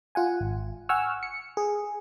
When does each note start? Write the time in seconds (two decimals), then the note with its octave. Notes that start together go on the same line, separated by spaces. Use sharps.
0.15 F4 F#5 G#5
0.41 G#1
0.89 F#5 G#5 C#6 E6 F6
1.23 C#7
1.57 G#4